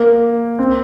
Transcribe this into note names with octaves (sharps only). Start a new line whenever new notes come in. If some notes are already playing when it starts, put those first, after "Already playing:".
Already playing: A#3
C4